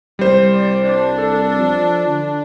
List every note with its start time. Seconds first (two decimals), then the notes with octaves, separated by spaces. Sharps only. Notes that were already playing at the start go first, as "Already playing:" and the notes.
0.19 C2 G3 C5
0.53 D5
0.84 D4
1.18 A4
1.60 F3
2.07 D3